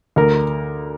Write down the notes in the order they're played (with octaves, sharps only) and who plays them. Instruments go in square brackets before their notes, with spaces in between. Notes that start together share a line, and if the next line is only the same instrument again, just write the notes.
[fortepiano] D2 A#4